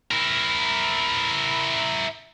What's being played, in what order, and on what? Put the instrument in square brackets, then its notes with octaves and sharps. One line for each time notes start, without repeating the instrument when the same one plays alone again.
[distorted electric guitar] E4 A#4